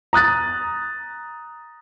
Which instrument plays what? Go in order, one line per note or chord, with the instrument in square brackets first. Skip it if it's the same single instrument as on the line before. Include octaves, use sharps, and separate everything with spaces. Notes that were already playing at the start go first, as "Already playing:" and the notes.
[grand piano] A#5 D#6 F#6 A6